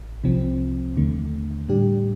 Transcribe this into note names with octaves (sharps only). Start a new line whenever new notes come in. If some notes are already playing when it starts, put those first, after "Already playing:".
Already playing: A1
C2 C3 F3 C4
D#2 D3 A3
A2 G3 D4 G4